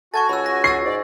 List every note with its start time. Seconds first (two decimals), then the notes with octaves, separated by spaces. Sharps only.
0.14 F#4 A4 G#5 C#6 G#6 A6
0.29 C#2 B5 E6
0.46 A#6
0.64 C#6 E6 A6 C7
0.85 G#2 D5